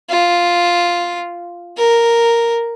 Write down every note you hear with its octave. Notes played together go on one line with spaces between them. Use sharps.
F4
A#4